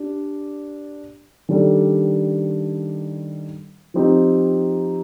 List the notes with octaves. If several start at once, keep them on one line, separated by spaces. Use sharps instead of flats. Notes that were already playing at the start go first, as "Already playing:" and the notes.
Already playing: D4 G4
D#3 G3 D4 A4
F3 C4 D#4 G4